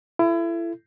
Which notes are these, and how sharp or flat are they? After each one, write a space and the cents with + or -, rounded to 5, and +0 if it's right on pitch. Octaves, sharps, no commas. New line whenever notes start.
E4 +30 A4 +0